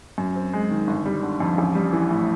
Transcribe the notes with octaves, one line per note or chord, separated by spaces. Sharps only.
F#2
C4
G#3
D#3
G1
G3
D3
F2
A1
G3
E3
A2